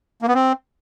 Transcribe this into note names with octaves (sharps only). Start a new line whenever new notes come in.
A#3
B3
C4